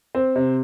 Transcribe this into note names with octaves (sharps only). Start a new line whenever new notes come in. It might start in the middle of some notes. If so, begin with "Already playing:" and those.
C4
C3